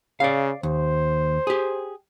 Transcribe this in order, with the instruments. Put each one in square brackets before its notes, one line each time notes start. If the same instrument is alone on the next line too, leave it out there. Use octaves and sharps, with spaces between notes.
[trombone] C#3 [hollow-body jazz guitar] D5 F5
[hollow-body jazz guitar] D#2 [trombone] C5
[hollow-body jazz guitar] G4 G#4